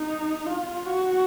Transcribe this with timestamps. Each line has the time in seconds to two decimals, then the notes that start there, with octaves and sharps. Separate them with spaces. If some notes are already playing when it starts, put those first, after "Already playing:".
Already playing: D#4
0.46 F4
0.86 F#4